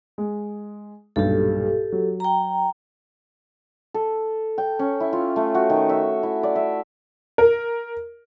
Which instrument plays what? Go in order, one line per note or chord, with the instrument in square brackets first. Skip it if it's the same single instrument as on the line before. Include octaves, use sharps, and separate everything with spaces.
[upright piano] G#3
[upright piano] B1 G2 A#2 [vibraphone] G4 A4
[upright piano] F#3
[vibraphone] G5 A#5
[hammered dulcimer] A4
G5
C#4
E4
F4
A3
F#4
D#3
E5
E4
D5
E5
[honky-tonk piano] A#4